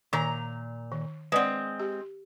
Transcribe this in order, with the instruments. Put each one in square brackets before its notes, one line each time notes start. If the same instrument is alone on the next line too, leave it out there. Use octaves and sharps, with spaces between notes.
[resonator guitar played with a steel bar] A#2 A#5 [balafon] D#3
[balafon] D#3
[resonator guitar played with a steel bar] G#3 C4 [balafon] B4 D5 F#5
[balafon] G4